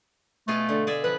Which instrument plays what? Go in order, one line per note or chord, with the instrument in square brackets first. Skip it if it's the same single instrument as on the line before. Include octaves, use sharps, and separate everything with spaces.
[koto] B2 F4 G#4 [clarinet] A3
[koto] D3
G#4 D5 E5
[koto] F3 [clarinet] B4